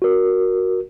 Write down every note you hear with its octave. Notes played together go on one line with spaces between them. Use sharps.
F#4 A#4